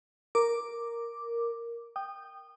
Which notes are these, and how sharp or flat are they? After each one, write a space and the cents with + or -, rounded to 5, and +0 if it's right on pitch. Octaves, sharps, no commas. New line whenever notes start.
A#4 +0 D6 +0
G5 +0 D#6 -25